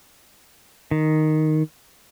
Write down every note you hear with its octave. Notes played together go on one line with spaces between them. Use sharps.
D#3